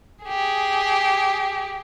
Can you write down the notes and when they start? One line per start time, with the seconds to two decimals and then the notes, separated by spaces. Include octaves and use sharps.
0.25 G4 G#4